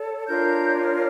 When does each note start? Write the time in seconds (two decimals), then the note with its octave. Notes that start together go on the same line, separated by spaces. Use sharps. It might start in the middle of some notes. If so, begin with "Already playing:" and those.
Already playing: A4 C#5
0.27 D4 F4 A#4 C#5 G6